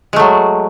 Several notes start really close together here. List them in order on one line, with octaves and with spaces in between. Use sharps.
G#3 A3 F#3